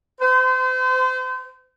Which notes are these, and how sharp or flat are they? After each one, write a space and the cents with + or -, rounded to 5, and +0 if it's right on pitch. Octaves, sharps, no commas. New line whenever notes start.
C5 -35